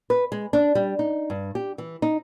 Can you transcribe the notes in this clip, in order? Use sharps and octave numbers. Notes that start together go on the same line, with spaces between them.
B4
G#3
D4
G3
D#4
G2
G4
E3
D#4